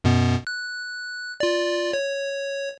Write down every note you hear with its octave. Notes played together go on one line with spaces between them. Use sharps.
F#2 B2 B3
F#6
F4 D5
C#5